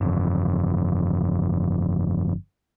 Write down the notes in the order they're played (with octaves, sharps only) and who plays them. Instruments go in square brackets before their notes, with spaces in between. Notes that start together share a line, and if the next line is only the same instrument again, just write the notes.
[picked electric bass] G1 F2